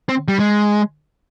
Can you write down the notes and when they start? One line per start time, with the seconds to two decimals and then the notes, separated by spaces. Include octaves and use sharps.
0.09 C4
0.28 G3
0.39 G#3